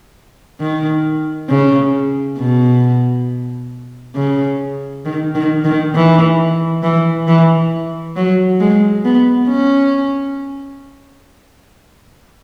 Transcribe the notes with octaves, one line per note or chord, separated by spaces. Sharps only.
D#3
C#3
B2
C#3
D#3
D#3
D#3
E3
E3
E3
F#3
G#3
B3
C#4